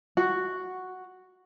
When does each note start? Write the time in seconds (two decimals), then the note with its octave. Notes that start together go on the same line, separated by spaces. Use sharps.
0.17 F#4